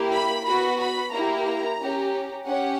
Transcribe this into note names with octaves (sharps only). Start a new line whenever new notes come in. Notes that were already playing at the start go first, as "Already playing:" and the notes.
Already playing: A#3 E4 G4
B5
B3 F#4 B5
B5
A#3 E4 G4 A#5
C#4 G4
C#4 G4 F#5